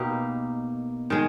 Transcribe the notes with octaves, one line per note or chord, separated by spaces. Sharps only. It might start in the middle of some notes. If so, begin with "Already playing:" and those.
Already playing: B2 A#3 D#4 G4
D#3 G#3